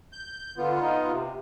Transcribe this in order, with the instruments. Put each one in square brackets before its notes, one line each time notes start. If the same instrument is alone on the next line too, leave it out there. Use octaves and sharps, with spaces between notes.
[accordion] G6
[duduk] D3 [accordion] B3 F4
[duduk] D#4
C3